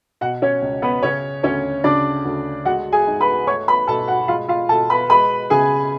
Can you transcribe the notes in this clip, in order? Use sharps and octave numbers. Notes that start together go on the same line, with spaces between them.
B2 F#4 F#5
C#4 C#5
C#2
B3 B4
C#3 C#4 C#5
D2 C#4 C#5
C#3 D4 D5
D2
G#3 F#4 F#5
G#4 G#5
G#2
B4 B5
A3 C#5 C#6
B4 B5
B2 A4 A5
F#4 F#5
G#3 F4 F5
F4 F5
B2 A4 A5
B4 B5
G#3 B4 B5
C#3 G#4 G#5